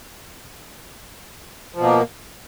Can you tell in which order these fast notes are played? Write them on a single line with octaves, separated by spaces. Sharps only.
F3 B2 A#3